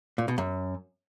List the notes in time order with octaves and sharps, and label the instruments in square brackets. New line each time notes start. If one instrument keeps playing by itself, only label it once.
[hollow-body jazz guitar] A#2
B2
F#2